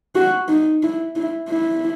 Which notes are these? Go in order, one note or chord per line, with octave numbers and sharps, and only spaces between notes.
F#4
D#4
E4
E4
E4